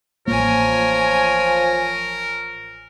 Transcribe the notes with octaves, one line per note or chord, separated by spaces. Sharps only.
A1 F3 A#3 A#4 C#5 G#5